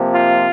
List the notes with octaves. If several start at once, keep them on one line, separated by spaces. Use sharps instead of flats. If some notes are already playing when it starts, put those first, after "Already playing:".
Already playing: C3 F3 A#3
F4